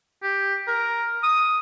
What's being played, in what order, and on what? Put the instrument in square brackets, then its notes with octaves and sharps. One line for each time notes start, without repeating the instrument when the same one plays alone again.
[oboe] G4
A#4
D#6